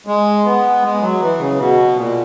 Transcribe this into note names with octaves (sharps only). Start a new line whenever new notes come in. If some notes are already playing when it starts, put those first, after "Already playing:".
G#3
B3
G#3
F#3
E3
C#3
B2
A#2